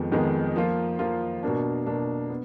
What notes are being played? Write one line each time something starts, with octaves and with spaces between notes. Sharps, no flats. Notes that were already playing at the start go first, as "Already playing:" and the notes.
Already playing: F2 D#3 G#3 B3
F2 D#3 G#3 B3
F3 A#3 F4
F3 A#3 F4
B2 A#3 D4
B2 A#3 D4
B3